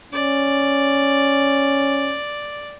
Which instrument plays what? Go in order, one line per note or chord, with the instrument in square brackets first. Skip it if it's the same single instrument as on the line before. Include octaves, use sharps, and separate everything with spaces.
[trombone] C#4 [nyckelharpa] D5